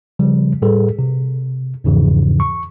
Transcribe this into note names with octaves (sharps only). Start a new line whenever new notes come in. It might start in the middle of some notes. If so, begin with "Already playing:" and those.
C#3 F3 G3
A2 G3 G#4 A4 B4
C3
E2 G#2 C#3 E3 F3
C#6